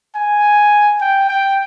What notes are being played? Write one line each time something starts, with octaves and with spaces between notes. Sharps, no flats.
G#5
G5
G5